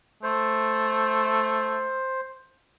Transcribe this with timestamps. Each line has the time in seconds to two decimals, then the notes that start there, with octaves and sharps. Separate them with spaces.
0.23 A3 C5